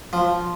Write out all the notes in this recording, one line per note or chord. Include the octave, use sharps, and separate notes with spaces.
F3